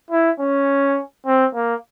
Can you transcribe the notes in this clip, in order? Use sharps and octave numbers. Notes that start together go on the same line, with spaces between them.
E4
C#4
C4
A#3